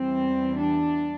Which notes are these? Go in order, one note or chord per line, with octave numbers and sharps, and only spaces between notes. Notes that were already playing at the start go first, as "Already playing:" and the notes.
Already playing: E2 E3 G3 C4
D4